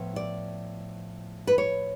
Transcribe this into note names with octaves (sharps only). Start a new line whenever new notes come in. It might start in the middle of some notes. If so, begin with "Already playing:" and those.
Already playing: A2 F3 B3
D5
B4
C#5